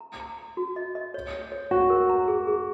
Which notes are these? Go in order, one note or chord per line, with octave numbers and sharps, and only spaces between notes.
A#5
A#5
A#5
F#4
D#5
D#5
C#5
C#5
C#5
F#4 C#5
A#4
A#5
G#4
G#4